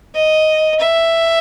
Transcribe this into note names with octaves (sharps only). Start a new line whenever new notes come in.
D#5
E5